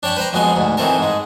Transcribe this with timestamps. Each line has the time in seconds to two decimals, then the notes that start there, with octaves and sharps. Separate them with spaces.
0.03 D4 C#5 G5 A5 B5
0.17 B4 C5 G5 A#5
0.33 F2 F#3 G#3 B3 G#4 C6
0.56 D2 G#2
0.77 D#3 E3 C4 C#4 A4 A#4
0.98 G#2 G#3